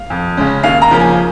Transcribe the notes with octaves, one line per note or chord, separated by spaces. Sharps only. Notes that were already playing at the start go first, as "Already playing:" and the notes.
Already playing: F5
F2
C#3 G#3 C#4
D#2 F5
A#5
C#3 F3 A#3 C#4
G#5